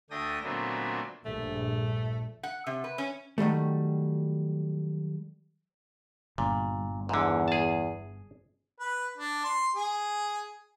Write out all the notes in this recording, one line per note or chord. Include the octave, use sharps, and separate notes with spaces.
D2 A3 D4 G5 D#6 A#6
A#2 D3 F#3 A3 B3 C4
A#1 G2 A3
F#5
C3
B4
C#4
D#3 F#3 G3 A3
G1 A#2
E2 G#2 D3
G#4 A5
B4
D4
C6
G#4